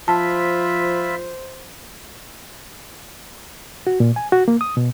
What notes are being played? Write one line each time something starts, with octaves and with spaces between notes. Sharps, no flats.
F3 F4 C5 E5 A5 B5
F#4
A#2
G#5
F#4
A#3
D#6
B2